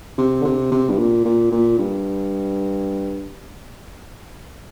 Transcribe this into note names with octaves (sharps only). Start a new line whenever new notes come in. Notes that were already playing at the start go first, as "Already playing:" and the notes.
C3
D3
C3
C3
G2
A#2
A#2
A#2
G2